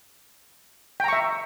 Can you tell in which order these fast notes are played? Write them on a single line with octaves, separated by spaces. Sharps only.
G5 A#5 C#6 E5